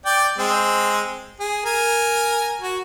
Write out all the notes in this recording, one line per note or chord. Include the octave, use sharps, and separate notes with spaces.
D5 G5
G#3 C4
G#4
A#4 G#5
F#4